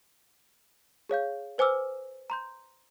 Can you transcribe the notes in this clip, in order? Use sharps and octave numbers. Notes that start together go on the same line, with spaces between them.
G#4 C#5 F5 G6
B4 C5 G#5 D6 E6 F6
A#5 C6 G6